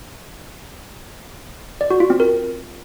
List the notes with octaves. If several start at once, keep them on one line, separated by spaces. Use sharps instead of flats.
D5
F#4
F4
C4
A#4